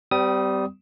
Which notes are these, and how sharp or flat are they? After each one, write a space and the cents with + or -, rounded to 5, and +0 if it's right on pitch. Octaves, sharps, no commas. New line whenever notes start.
G3 -10 C4 -40 D#6 +10